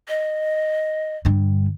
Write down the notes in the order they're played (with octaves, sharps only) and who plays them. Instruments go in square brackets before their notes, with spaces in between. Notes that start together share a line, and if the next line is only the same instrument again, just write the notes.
[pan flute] D#5
[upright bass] G2 D3